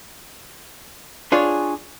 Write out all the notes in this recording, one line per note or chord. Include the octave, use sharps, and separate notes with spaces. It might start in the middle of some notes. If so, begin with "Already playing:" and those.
D4 F4 G#4 C#5